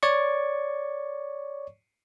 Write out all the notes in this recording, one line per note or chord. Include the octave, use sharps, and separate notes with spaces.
C#5 D5 C#6